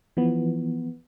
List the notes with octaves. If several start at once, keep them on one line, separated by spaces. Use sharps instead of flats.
E3 F3 B3